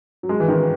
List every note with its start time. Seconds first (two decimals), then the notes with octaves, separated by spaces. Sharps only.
0.23 F#3
0.29 G#3
0.40 E3
0.48 D#3